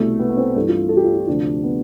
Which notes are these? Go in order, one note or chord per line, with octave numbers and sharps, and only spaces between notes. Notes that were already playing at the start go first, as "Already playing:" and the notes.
Already playing: C2 B2 A3
B3
B3
C4
G2 E3 A4
F4
A4
G4
F4
F4
D2 C3 F3 D4
B3